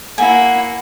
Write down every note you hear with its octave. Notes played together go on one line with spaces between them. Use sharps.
A#3 E4 F#5 G#5